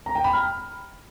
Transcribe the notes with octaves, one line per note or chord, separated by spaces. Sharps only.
A#5
G5
B5
F6